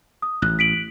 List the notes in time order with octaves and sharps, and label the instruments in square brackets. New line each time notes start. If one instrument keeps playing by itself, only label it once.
[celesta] D#6
[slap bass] A1 [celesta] F#6
[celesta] B6 D7 F#7